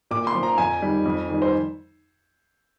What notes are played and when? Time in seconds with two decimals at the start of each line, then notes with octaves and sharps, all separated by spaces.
0.11 A#2 D6
0.27 C6
0.35 F3
0.43 A#5
0.58 F2 G#5
0.82 D#3 G3
1.06 F2
1.28 D#3
1.33 G3
1.42 C5